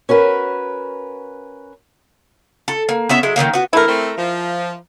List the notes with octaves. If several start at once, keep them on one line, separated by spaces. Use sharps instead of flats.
C#4 F#4 A#4 B4
A4
A#3
B3 C#4 E5
F#3 G#3 E4
D#3 E3 F#3 A#3
B3 F#4
D3 E3 A3 E4 A#4
A3 C4
F3